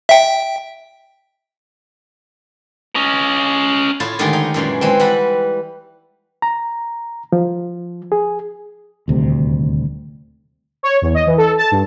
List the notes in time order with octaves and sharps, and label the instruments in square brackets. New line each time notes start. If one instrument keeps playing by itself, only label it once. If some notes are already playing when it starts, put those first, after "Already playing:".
[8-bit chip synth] E5 G5
[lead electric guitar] C#4 D#5
[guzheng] A2 E4 F4 C#5 A5
D3 D#3 G#3 A3 G4 G#4
D#4
F#2 A#2 E3 G#3
E3 G#3 C4
E3 G3 F#5 B5
[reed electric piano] A#5
F3
G#4
[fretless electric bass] D#1 D2 C3
[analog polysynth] C#5
E2
D#5
E3
A4
A5
G2